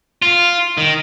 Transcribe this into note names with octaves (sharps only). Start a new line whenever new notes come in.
F4
D#3